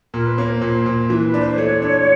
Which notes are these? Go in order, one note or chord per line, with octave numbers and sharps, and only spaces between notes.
A#2 A#4
B4
A#3 C#5
C5
A#2
A#2
E3 B4
B4
D4
C5
A3 C#5
D4